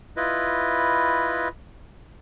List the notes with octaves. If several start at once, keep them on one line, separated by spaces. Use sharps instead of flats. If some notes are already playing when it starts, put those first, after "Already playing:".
E4 F4 B4 D#5